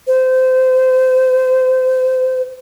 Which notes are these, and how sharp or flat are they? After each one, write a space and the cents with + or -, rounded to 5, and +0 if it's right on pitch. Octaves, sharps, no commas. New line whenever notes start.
C5 -25